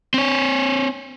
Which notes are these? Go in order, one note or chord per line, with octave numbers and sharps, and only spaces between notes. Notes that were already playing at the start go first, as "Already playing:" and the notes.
C4 C#5